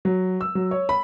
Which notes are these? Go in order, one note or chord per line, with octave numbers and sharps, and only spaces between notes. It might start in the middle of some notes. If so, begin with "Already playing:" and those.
F#3
E6
F#3
C#5
B5